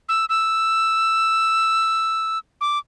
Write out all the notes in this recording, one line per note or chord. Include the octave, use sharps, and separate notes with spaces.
E6
E6
D6